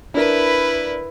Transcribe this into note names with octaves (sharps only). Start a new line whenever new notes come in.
D4 E4 A#4 B4